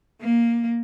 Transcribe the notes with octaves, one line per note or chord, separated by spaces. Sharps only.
A#3